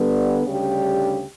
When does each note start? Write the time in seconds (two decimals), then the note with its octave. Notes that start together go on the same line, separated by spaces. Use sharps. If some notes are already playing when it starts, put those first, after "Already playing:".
Already playing: D3 G3 B3
0.45 D2 C#3 G3 D4 G4